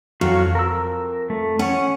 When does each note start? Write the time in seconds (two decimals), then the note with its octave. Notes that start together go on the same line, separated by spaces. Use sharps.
0.21 F2 F#3 F#4 F5
0.55 A#4 E6
1.30 A3
1.59 C#4 C#5 F#5